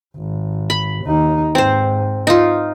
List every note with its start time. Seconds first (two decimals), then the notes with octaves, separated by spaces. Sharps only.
0.17 G#1
0.70 B5
1.04 D#2 D#4
1.55 G#2 C4 C5
2.27 D#4 F4